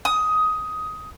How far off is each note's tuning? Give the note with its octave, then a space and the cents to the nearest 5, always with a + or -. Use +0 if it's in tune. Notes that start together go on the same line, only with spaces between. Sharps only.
D#6 +15